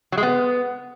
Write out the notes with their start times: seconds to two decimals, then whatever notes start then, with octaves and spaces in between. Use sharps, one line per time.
0.12 F#3
0.18 G#3
0.23 B3